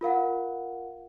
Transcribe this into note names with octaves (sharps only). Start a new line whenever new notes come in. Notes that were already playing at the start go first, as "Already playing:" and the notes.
F4 A#4 F5 F#5